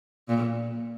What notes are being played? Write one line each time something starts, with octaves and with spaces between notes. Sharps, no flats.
A#2